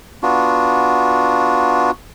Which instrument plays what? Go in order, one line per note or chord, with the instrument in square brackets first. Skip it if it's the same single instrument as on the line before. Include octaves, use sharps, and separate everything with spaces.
[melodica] B3 D4 F4 F#4